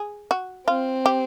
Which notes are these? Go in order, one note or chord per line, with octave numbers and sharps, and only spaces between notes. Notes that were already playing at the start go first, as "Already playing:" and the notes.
Already playing: G#4
F#4
C4 F4
G4